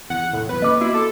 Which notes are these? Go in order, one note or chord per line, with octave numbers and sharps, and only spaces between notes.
E2 F#5
E1 A2
F#1 B1 E2 B4
A#3 C#4 D#5 D6
A#3 B3 E4 F#4
A4